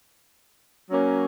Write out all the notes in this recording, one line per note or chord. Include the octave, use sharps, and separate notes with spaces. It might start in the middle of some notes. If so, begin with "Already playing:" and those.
F#3 A#3 C#4 F#4